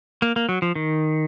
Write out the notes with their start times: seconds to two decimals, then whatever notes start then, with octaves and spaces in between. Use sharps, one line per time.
0.22 A#3
0.36 A#3
0.49 F#3
0.62 F3
0.75 D#3